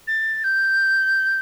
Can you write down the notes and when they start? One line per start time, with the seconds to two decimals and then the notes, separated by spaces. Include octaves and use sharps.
0.07 A6
0.44 G6